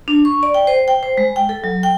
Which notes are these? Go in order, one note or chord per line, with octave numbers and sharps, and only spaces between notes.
D4
C#6
D5
G5
C5
G5
C5
G#3
G5
A4
F#3
G5